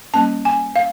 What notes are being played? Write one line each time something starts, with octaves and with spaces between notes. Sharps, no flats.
G3 A#3 C#4 A5
G#5
F5